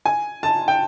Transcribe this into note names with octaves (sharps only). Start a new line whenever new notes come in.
G#5
A5
G5